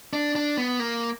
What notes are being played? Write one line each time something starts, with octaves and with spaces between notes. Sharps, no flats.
D4
D4
B3
A#3